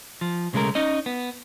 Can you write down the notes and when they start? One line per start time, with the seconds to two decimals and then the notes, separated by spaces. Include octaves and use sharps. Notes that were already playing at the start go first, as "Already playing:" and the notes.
0.21 F3
0.53 B1 C#3 G#3 A3 A#4
0.75 C#4 D#4 D#5
1.06 B3